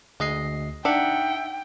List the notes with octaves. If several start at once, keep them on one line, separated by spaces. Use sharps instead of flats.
D2 G#3 D#5 C7
D4 D#4 E5 F#5 G5